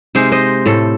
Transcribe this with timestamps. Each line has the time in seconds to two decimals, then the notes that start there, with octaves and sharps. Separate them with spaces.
0.15 C3 G#3 D#4 C5
0.32 C5 D#5
0.66 A2 A4